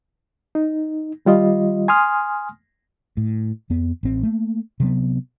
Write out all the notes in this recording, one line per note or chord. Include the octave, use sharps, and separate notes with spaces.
D#4
D#3 G3 F4 D#5
G#5 C6 D#6 F6
A2
F2 B3
A1 C4
A3 A#3
C3 F#3 B3